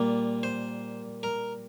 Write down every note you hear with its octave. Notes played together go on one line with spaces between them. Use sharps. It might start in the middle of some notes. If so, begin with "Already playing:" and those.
Already playing: A#2 G3 A#3
C5
A#4